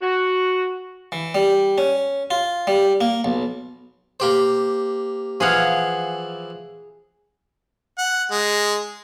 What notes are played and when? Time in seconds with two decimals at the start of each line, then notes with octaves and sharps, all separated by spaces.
0.02 F#4
1.12 E3
1.35 G3
1.78 C#4
2.31 F4
2.67 G3
3.01 A#3
3.24 B1
4.20 A#3 G4 C5
5.40 E3 F3 G#4 F5 F#5
7.98 F#5
8.31 G#3